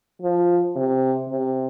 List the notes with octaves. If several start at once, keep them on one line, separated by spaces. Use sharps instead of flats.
F3
C3
C3